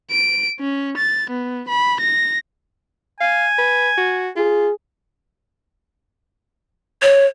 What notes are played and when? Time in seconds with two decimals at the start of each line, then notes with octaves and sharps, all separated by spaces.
0.11 D7
0.60 C#4
0.97 A6
1.30 B3
1.69 B5
2.00 A#6
3.21 F5 G#5
3.58 B4
3.98 F#4
4.36 F4 G#4
7.02 C#5